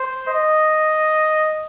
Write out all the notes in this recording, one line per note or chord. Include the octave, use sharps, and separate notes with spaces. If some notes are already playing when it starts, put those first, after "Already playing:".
Already playing: C5
D#5